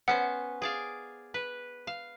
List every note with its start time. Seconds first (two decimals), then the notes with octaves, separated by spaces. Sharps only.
0.08 B3 C#4 C5 F#5
0.62 G#4 D5 F5
1.34 B4
1.87 F5